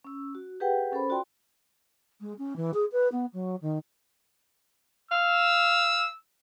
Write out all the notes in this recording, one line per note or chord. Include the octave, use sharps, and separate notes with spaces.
C#4 E6
F#4
G4 G#4 B4 F#5 G5
C#4 A4 A#4 C5 B5
F4 F#4 D5 G5 C6
G#3
C#4
E3
G#4
B4
B3
F#3
D#3
F5 E6